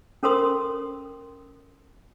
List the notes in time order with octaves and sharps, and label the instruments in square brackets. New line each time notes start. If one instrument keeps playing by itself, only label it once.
[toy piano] C#4 A4 A#4 C5 C6 D#6